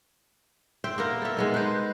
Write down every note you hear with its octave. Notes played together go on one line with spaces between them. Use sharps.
C5 E5 G5
A#3 B3 A#4
A4 E5
G#3 B3 D#4
B4 C5